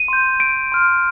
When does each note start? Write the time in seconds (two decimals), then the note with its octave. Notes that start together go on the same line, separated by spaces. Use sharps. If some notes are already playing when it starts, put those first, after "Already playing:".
Already playing: D#7
0.08 C6 G6
0.40 D7
0.72 C6 F6